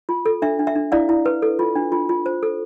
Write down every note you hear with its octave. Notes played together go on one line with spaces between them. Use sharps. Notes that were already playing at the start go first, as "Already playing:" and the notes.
F4
A4
D4 E5
D4
E5
D4
E4 D5 F5
E4
B4
A4
F4
D4
F4
F4
C5
A4